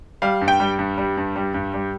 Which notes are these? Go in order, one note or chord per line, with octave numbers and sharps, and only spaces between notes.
G3 F5
G2
G5
G3
G2
G3
G2
G3
G2
G3